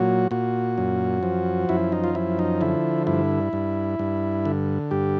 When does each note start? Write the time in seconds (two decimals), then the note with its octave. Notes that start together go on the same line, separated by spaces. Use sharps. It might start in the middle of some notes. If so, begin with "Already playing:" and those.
Already playing: A#2 F#3 F#4
0.31 A#2 F#4
0.78 F#2
1.23 F3
1.69 F#2 E4
1.92 D#4
2.04 F4
2.15 F3 E4
2.39 D#4
2.61 D3 E4
3.07 G2 E4
3.53 G2
3.99 G2
4.45 D3
4.91 G2 G4